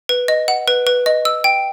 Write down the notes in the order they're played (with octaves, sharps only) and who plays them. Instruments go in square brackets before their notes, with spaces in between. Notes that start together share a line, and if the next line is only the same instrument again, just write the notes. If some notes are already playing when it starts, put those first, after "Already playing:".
[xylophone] B4
D#5
F#5
B4
B4
D#5
E6
G5